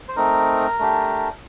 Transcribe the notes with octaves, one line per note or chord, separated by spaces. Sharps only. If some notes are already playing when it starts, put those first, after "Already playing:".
C5
A3 C4 D#4 A#4
A3 D4 G4